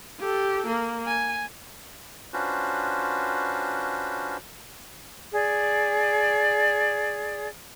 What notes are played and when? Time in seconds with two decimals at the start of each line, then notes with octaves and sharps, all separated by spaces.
0.19 G4 A4
0.67 A#3
1.06 G#5
2.33 C#4 D4 F4 F#4 B4 C5
5.34 G#4 D5